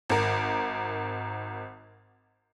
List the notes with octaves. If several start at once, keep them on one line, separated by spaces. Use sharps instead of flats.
G#1 A#4